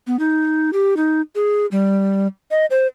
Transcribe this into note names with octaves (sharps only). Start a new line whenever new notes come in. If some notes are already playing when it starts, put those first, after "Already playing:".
B3
D#4
G4
D#4
G#4
G3
D#5
C5